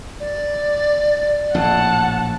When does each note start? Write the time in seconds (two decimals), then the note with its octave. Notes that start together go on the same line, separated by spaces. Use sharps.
0.20 D5
1.55 A#1 A2 F#5 A5